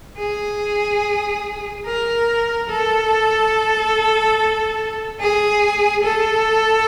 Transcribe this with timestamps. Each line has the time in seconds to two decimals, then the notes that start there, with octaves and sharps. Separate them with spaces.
0.18 G#4
1.85 A#4
2.69 A4
5.20 G#4
6.03 A4